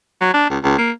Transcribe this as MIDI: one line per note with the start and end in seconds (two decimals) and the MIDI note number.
0.21 0.32 54
0.34 0.46 62
0.50 0.58 37
0.63 0.78 37
0.78 0.91 58